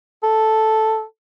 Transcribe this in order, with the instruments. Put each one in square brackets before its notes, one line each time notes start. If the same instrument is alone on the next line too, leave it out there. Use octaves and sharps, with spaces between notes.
[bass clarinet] A4